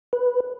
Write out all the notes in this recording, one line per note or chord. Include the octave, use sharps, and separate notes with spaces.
B4